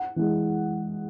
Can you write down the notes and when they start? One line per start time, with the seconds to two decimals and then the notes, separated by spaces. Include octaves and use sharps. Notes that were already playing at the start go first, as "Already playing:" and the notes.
Already playing: F#5
0.16 E3 G#3